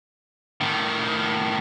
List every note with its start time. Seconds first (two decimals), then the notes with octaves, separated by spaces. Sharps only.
0.61 A2 D#3